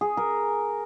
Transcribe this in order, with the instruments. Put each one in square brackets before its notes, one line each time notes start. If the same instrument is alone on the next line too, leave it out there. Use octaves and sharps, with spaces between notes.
[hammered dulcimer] G#4
A#4